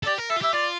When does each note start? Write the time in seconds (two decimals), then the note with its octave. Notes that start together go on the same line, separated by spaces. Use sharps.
0.03 A4
0.06 G4 D5
0.18 A#4
0.30 A4 E5
0.36 F4
0.41 G4 E5
0.53 F4 D5